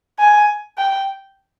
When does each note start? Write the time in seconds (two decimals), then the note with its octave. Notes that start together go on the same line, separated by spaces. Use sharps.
0.19 G#5
0.78 G5